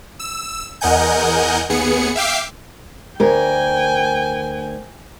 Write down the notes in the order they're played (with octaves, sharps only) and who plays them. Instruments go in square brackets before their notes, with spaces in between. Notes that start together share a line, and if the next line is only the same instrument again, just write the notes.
[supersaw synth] E6
E2 A#4 D#5 F#5 G#5 G6
D#2 B3 G#4 C#7
E5 F5 G5 D6 C7
[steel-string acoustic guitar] D2 A#4 [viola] G5 G#5